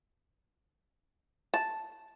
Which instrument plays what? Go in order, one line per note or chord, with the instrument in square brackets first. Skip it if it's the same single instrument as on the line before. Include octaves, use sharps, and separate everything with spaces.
[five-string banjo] A5